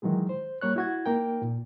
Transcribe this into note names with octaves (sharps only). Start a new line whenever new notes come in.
D#3 E3 F#3 G#3 G#4
C5
G3 A#3 C#5 F#6
E4 F#4 G#6
A#3 D#4 A#4 G5
A#2